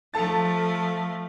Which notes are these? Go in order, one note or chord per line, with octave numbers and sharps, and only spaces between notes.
F3 A3 A4 A5 A6